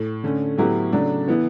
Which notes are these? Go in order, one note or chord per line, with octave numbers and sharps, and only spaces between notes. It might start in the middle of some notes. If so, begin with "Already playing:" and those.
Already playing: A2
D3 A3 C#4
A2 F#3 B3 E4 G4
C#3 F#3 A3 D4 A4
E3 B3 E4